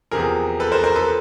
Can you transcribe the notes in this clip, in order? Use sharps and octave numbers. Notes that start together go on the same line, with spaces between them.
E2 C3 F3 G#4 A#4
A4 B4
A#4 C5
A#4 C5
A4 B4